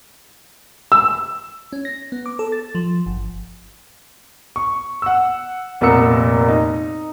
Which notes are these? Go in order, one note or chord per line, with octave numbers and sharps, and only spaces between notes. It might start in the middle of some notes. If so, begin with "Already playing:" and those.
E6
C#4
A#6
B3
D6
A4
A6
F3
G1
C#6
F#5 E6
F1 A#2 B3 A#4 E6 C#7
D#4